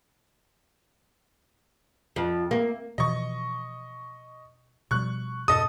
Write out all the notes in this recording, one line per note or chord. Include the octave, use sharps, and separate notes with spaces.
F2
A#3
B2 E3 F3 D#5 C#6
B2 F3 G3 C#6 F#6
F2 G#2 B2 A4 D#5 D#6